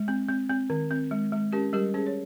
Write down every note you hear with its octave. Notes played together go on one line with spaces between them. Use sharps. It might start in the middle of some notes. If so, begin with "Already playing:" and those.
Already playing: G#3
C4
C4
C4
D#3
C4
G#3
G#3
C#4 G4 A#4
G3 G4 A#4
C#4 G#4 C5
C#5